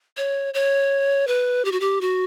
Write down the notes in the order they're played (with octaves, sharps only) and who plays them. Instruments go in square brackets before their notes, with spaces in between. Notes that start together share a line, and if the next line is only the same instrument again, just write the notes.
[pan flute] C#5
C#5
B4
G4
F#4
G4
F#4